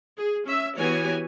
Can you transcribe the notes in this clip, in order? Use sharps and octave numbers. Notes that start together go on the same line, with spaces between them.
G#4
C#4 E5
E3 B3 F#4 G4 C#5 G#5